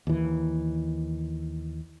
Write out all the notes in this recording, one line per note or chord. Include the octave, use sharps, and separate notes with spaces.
D#2 E3